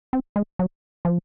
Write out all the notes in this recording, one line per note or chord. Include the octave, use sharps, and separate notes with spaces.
C4
G#3
F#3
F3